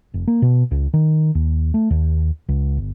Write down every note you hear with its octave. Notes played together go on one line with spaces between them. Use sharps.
F1
A#3
B2
C#2
D#3
D#2
A3
D#2
C#2
G1